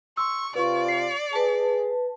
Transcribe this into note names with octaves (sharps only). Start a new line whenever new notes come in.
C6 C#6 E6
C3 F4 B4 D5 C#6
C7
G#4 B4 A5